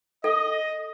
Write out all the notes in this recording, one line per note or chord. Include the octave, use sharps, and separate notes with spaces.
A4 D#5